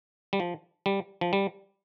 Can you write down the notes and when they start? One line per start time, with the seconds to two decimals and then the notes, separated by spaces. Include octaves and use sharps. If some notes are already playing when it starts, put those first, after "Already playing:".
0.33 G3
0.40 F3
0.86 G3
1.21 F3
1.33 G3